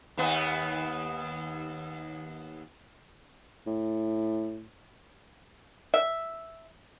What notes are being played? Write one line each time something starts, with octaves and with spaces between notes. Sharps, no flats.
D#2 B3
A2
E5